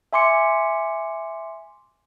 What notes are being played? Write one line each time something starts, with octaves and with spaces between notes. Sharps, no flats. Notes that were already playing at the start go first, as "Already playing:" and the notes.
E5 G#5 C6 D6 C#7